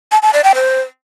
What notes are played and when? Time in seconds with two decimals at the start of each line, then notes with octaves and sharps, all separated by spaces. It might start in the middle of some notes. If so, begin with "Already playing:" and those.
0.12 A5
0.23 A5
0.33 D5
0.44 G5
0.55 C5